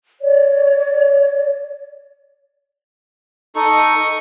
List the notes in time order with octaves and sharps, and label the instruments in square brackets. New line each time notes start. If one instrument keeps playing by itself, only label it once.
[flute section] C#5 D5
[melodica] D#4 A4 [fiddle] D#5 C#6